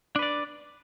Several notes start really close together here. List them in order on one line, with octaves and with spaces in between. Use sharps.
D4 B4 D5